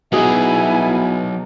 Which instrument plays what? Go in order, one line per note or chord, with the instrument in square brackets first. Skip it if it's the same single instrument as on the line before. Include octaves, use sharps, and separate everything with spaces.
[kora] B2 G#4 [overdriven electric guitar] F#3 D#4 [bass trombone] B3 [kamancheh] E4 G#5